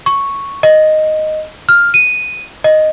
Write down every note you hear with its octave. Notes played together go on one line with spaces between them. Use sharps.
C#6
D#5
F6
D#7
D#5